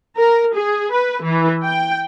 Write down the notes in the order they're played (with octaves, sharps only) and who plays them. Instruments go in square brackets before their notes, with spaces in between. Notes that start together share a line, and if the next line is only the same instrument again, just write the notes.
[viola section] A#4
G#4
B4
E3
G5